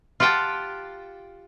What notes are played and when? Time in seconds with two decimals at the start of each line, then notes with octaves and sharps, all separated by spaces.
0.20 F4 G4 F#5 G5 A5